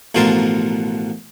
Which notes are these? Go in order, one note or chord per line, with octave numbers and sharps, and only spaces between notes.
A1 B2 F3 A#4 A5 C6